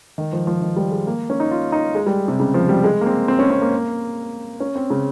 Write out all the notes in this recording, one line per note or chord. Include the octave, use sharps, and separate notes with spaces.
D#3
F3
F3
D#3
G3
G#3
A#3
C#4
D#4
F4
D#4
G#3
G3
C3
C#3
F3
G3
G#3
A#3
C4
C4
C#4
C4
A#3
C#4
C4
C#3